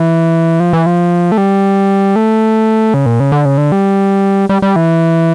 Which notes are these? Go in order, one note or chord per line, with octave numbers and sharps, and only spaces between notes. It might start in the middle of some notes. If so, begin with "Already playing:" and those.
Already playing: E3
F3
E3
F3
A3
G3
A3
C#3
A#2
C#3
D3
C#3
D3
G3
G3
G3
E3